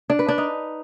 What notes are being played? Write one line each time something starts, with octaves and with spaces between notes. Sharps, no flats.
D4
B4
D4
D#4